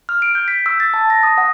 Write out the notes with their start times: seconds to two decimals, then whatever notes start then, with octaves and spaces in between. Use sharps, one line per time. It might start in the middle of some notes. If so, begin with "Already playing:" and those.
0.09 F6
0.22 D7
0.35 G6
0.48 B6
0.66 E6
0.80 A6
0.94 A5
1.10 A#6
1.23 D#6
1.38 F#5